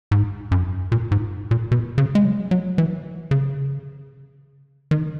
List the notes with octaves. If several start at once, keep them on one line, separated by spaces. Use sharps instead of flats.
G#2
F#2
A#2
G#2
A#2
B2
C#3
G#3
F#3
F#3
E3
C#3
D#3